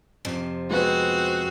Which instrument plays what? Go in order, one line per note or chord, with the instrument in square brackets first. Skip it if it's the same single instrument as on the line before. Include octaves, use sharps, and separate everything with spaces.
[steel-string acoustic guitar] F2 C3 F3
[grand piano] G#3 B3 [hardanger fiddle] C4 F#4